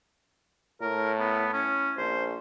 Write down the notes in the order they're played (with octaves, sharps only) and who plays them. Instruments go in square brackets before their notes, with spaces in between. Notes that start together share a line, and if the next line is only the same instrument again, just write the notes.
[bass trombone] A2 [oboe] A#4
[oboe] B3
C#4
[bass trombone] A#1 [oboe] C5